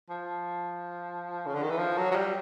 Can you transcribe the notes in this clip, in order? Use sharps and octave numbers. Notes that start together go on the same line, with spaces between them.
F3
C#3
D3
D#3
E3
F3
F#3
F#3
G3